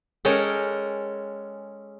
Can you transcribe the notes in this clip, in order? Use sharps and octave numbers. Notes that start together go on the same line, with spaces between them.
G#3 C#4 A4 A#4 G5